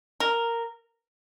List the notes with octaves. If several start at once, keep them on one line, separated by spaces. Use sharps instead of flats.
A#4